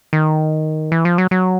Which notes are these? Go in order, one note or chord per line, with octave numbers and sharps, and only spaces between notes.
D#3
E3
F3
F#3
F#3